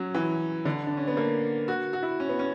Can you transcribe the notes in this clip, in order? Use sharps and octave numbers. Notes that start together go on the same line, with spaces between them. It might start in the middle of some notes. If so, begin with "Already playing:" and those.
Already playing: F#3 C#4
E3
D3
D4
C#4
B3
A#3
F#4
F#4
E4
C#4
B3
C#4